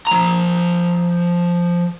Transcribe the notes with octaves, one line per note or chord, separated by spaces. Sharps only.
F3 A#5